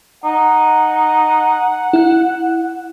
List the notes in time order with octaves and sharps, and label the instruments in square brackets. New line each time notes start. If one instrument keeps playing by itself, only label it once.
[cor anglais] D#4 [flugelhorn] F#5
[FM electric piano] E4 F#6